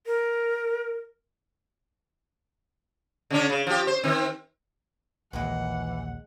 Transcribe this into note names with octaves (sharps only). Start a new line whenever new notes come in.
A#4
C#3 C#4 D4
C#3
F3 G4
C5
D#3 C4
A#1 D#2 E3 G#3 A#3 B4 F#5